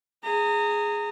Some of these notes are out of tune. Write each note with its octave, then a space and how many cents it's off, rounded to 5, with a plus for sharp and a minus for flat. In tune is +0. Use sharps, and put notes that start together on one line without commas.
G#4 +0 A#5 -30